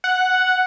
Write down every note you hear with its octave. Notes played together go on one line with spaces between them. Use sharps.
F#5